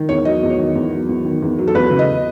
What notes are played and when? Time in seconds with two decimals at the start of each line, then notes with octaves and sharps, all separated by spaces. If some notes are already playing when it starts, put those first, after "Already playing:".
Already playing: D#3
0.09 E2 C#5
0.25 F#3 D#5
0.43 E2
0.50 C#5
0.59 D#3
0.75 E2
0.92 F#3
1.09 E2
1.25 D#3
1.42 E2
1.58 F#3
1.67 A4
1.74 E2 B4
1.91 C#3
1.99 D#5